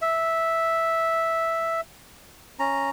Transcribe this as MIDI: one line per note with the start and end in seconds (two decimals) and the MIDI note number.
0.02 1.81 76
2.59 2.90 61
2.59 2.90 82